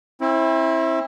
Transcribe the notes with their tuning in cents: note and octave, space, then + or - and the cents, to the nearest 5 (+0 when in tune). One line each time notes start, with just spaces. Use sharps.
C4 +35 E4 -10